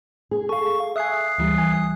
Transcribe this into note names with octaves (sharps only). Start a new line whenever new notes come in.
G#4
A4 F5 C#6
E5 G#5 D#6 F#6 C7
D2 E3 G3
G#5